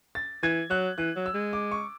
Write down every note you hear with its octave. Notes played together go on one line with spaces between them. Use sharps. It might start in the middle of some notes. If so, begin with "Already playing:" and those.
A6
E3 G#6
F#3 F#6
E3 F#6
F#3
E6
G#3
D6
C#6